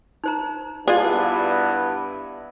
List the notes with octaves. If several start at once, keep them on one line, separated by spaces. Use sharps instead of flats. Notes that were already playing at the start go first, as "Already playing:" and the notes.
D#4 C5 A#5
G2 B3 E4 F4 G#4 C5 D5